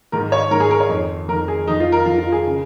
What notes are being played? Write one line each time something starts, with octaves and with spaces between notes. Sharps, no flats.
G#2 D#3 A#4
C#5
G#2 D#3 A#4
G#4
A#4
C#5
F2 D#3
F2 D#3 A#4
G#4
F2 D#3 D#4
F4
A#4
F2 D#3 F4
F4
G#4
C#3